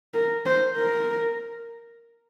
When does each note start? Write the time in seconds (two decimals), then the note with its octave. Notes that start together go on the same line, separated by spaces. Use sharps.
0.14 A#4
0.45 C5
0.77 A#4